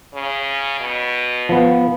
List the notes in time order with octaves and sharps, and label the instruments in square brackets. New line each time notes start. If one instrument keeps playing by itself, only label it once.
[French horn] C#3
B2
[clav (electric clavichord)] F3 B3